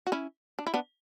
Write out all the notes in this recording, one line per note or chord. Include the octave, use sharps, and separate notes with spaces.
F#4
C#4 E4
D4
E4
B3 D4